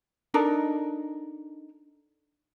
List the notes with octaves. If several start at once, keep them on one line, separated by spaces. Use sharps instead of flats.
D4 D#4 A4 A#4